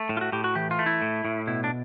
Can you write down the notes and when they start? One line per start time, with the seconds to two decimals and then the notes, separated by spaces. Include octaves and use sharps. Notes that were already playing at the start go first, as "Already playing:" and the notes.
Already playing: A3
0.09 A2
0.17 F4
0.21 F#4
0.32 A2 G4
0.44 F#4
0.55 E3 G4
0.71 F4
0.79 A3
0.86 E4
1.02 A2
1.25 A2
1.47 B2 E4
1.64 D4